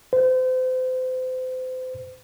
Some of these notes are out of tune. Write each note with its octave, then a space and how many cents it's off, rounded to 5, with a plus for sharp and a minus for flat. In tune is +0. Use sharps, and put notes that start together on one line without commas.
C5 -35